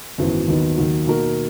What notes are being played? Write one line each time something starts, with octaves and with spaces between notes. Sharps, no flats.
G#1 F#2 E3 B3 F#4
D#2 D#3 F#3 B3 D#4
D#2 D#3 F#3
B2 A#3 D#4 F#4 A#4